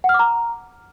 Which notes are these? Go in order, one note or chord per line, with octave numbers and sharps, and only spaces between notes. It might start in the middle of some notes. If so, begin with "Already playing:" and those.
F#5
F6
D6
A#5